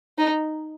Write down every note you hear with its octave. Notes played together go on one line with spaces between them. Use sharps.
D#4